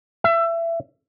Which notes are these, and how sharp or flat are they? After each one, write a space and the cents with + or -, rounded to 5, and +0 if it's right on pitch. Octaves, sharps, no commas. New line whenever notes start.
E5 +25